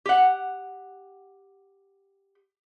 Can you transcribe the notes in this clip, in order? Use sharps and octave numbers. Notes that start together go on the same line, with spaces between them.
G4 F#5